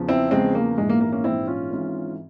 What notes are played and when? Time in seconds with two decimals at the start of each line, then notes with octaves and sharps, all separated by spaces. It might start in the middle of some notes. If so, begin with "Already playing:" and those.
Already playing: E2 C#3 F3
0.08 C4 E4
0.31 E2 C#3 F3 G#3 C4
0.55 A#3
0.78 A#1 G#2 E3 G#3
0.89 A#3
1.01 A#3
1.12 A#3 C#4
1.24 A#1 G#2 E3 C4 E4
1.47 C#4 F4
1.71 G#1 G#2 E3